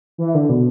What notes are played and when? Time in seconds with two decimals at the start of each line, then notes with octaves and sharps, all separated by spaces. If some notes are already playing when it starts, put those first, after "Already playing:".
0.18 E3
0.35 D3
0.49 B2